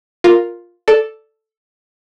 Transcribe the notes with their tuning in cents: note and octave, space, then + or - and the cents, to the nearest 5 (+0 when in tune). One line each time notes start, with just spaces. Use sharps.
F4 +5 A#4 +0
A4 +0 D5 +0